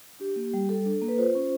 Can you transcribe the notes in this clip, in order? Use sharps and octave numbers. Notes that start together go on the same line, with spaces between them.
D4 G4
A#3
G3
G3 A4
D4
A#3
B4
F4 C5
C#4